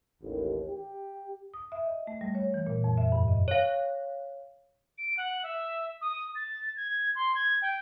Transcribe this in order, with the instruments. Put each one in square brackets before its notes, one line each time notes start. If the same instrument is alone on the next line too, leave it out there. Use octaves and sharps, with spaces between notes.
[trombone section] A1 D#2
G4
[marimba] D#6
E5
D#5
A3
G3
C#5
E3
A#2
F2
E5
G2
D#5
[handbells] C#5 F5
[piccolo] D7
F#5
E5
D#6
A6
G#6
C6
G#6
G5